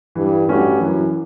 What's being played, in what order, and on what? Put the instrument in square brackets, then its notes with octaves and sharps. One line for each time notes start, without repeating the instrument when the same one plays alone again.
[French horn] G2 [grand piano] E3
[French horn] G2 [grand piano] A3 C#4 F#4
[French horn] F#2 [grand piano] E3